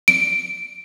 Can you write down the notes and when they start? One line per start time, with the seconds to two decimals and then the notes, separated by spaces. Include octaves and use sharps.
0.08 D7